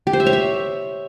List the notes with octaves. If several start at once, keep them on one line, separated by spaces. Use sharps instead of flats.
G4
C5
E5
C#5
E5